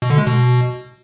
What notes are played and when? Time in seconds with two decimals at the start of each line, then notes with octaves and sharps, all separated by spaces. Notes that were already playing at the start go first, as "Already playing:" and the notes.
0.02 B2
0.10 D3
0.18 G#3
0.26 B2